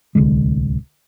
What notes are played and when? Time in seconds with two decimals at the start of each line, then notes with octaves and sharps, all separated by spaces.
0.15 D1 C2 D3 G#3